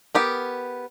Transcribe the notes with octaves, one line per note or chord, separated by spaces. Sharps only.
B3 G4 A#4